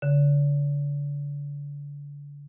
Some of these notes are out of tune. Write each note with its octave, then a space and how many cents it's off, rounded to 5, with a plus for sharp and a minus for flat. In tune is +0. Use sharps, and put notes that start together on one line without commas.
D3 -35